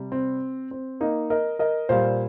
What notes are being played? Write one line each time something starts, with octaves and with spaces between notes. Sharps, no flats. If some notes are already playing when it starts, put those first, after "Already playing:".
Already playing: C3 G3
C4
C4
A#3 D#4
A#4 D#5
A#4 D#5
A#2 G3 C5 F5